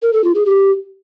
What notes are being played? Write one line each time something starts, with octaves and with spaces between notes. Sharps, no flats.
A#4
A4
F4
G#4
G4